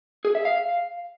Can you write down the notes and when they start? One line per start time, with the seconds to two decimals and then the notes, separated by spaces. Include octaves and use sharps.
0.25 G#4
0.35 E5
0.45 F5